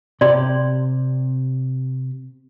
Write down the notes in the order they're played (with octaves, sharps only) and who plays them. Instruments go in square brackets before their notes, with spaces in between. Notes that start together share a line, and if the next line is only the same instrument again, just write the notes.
[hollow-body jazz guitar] C3 G4 [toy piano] D5 C6